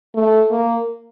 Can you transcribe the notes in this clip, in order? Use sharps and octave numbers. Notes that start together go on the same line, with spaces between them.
A3
A#3